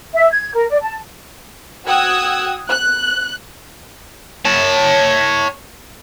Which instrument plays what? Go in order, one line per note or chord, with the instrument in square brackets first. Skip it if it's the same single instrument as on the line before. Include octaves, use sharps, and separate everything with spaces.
[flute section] E5
G#6
A#4
D5
A5
[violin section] F#4 G5 D#6 E6 F#6 G#6
F#6
[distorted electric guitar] C#5 A5